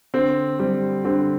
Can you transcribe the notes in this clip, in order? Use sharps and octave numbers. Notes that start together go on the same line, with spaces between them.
D3 C4
G3 C4
D3 C4